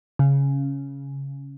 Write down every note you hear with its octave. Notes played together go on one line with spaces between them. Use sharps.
C#3